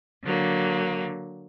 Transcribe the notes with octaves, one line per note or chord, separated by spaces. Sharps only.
D3 F#3 A#3